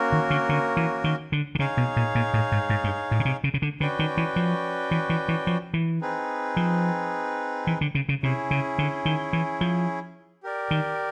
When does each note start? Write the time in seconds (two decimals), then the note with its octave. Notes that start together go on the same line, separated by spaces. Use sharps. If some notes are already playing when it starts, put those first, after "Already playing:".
Already playing: A#3 C#4 F#4 A#4
0.12 D#3
0.30 D3
0.49 D3
0.77 E3
1.04 D#3
1.32 D3
1.55 D3
1.59 C#3 D#4 G#4 C#5 F5
1.77 B2
1.96 A#2
2.15 A#2
2.33 A2
2.52 G#2
2.69 G#2
2.84 G2
3.11 A2
3.20 C#3
3.25 C3
3.44 C#3
3.54 C#3
3.62 D3
3.80 D3 C#4 F#4 B4 D5 G5
3.99 D#3
4.17 E3
4.36 F3
4.91 E3
5.10 E3
5.28 E3
5.47 F3
5.74 E3
6.01 C4 D#4 G#4 B4
6.57 F3
7.67 E3
7.81 D3
7.95 C#3
8.09 C#3
8.22 C3 C#4 E4 G#4
8.51 C#3
8.78 D3
9.05 D#3
9.33 E3
9.61 F3
10.43 G4 A#4 D5
10.71 D#3